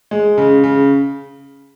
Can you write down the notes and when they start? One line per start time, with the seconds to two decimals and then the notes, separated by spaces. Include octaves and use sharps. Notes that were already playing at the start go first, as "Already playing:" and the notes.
0.11 G#3
0.38 C#3
0.64 C#3